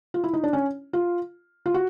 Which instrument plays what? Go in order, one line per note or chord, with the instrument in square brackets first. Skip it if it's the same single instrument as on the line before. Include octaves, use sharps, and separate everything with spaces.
[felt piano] F4
E4
D#4
D4
C#4
F4
F4
F#4